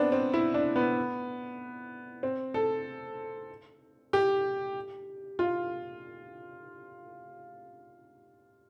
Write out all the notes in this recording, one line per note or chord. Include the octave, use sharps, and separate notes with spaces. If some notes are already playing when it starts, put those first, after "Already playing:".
Already playing: B3 C4 D4
C4
E4
D4
B3
C4
A4
G4
F4